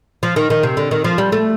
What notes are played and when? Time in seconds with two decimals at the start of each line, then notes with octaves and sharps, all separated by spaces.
0.23 F3
0.36 D#3
0.50 D#3
0.63 C3
0.77 D3
0.91 D#3
1.04 F3
1.18 G3
1.32 A3